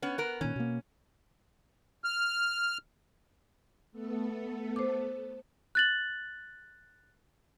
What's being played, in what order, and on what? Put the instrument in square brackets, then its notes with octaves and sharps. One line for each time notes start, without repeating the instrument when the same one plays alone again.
[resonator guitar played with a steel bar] B3 C#4
B3 A#4
[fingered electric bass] A#2 D#3 [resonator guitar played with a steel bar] C#4
[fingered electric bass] B2 A#3
[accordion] F6
[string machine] A3 B3 A4
[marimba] C5 D6
[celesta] F#6 A6 F#7